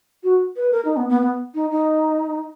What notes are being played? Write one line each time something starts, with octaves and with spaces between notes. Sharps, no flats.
F#4
B4
A#4
D#4
B3
B3
B3
D#4
D#4